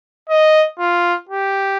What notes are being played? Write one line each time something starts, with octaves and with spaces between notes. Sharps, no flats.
D#5
F4
G4